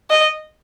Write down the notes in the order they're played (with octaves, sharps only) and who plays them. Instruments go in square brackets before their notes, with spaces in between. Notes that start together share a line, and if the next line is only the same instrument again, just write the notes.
[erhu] D#5